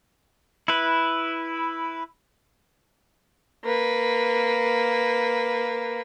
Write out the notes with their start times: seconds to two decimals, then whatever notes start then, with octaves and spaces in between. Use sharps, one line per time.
0.68 E4 B4
3.64 A#3 B4